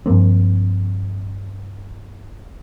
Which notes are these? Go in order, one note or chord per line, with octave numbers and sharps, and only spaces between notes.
G2 F3 A#3 C4